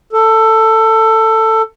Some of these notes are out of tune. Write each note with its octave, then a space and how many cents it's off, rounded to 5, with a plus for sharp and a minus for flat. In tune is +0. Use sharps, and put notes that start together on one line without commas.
A4 +15